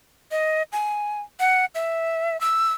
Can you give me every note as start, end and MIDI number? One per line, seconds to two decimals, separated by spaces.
0.31 0.63 75
0.72 1.21 80
1.40 1.65 78
1.75 2.39 76
2.41 2.73 88